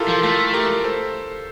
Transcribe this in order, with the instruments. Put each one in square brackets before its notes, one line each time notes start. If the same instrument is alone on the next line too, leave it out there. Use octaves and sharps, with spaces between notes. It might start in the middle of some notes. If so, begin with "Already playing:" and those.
Already playing: [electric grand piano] E4 F4 G4 A4 A#4
[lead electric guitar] F3
[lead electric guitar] A3 [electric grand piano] F4 A4
[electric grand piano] G4 A#4
A4 C5